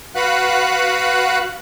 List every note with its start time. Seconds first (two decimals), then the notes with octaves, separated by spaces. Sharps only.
0.15 F#4 B4 F5 F#5 B5 F#6